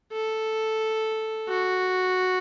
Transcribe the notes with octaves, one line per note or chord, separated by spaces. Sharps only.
A4
F#4